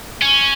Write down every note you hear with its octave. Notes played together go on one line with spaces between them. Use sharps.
C#4